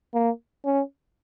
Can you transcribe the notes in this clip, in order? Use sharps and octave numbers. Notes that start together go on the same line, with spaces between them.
A#3
C#4